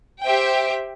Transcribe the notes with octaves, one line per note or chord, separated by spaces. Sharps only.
G4 C5 E5 G5